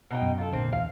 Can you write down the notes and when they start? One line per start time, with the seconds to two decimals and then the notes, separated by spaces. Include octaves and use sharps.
0.11 B2 D#4 G5
0.22 F#2
0.38 F4 A4
0.52 A#1 A#2 D3 C4
0.73 E2 F5